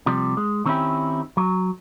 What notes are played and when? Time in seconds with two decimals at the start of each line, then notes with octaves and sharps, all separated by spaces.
0.06 C3 F3 G3
0.37 G#3
0.66 D#3 C4 C#4 D#4 E4 G4
1.37 F#3